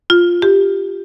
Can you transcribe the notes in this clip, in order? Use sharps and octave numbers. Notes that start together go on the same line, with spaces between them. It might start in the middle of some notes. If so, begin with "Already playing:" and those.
F4
G4